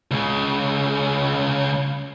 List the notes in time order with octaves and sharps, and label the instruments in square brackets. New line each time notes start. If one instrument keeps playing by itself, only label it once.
[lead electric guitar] C#2 C#3